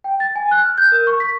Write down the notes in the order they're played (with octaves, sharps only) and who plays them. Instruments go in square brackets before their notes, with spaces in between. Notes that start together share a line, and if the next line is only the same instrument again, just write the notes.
[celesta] G5
A6
G#5
F#6
F6
G6
A#4
C#6
B6